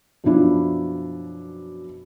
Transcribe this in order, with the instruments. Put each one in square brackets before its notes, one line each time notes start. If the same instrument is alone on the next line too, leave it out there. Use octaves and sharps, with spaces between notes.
[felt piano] F#2 B2 F3 D4 E4